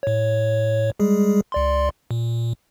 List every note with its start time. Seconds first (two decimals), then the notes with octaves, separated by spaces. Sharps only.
0.03 A2 C#5
1.00 G3 G#3 G#4
1.52 C#2 D5 C6
2.11 A#2